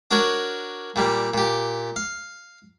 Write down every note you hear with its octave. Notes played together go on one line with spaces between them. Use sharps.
D4 F#4 A#4 C#5
A#2 G3 A#3
A#2 G4
F5